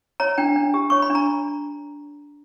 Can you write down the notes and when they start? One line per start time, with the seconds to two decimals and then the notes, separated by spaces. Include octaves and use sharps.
0.20 C#5 A#5
0.38 D4 G5
0.56 D4
0.74 G4
0.90 C#5 C#6
1.02 B5
1.10 D4
1.15 A#5